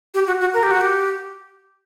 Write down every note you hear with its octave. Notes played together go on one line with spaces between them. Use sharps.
G4
F#4
F#4
A#4
G4
F#4
G4